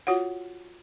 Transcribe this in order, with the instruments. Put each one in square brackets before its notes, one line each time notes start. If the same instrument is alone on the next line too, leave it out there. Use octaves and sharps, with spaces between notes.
[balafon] F4 F#4 C#5 F#5